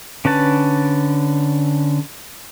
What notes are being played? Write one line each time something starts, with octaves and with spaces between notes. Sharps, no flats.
D3 C#4 B4 A5